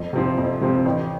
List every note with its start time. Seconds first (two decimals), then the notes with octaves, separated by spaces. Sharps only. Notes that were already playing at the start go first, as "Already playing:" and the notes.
Already playing: F2
0.13 C3 F3 C4
0.37 F2
0.61 C3 F3 C4
0.85 A1